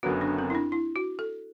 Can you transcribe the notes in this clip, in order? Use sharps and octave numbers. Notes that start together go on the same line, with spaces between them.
F#1 F#2 D3 F#3 B3 F#4
D4
C4
E4
D4
E4
F#4
A4